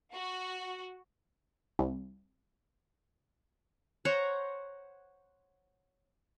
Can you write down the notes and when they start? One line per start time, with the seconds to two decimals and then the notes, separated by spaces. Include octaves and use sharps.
0.13 F#4
1.79 C2
4.05 C5 C#5 F#5 A#5